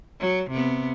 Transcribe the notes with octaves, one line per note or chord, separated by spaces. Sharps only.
F#3
C3 B3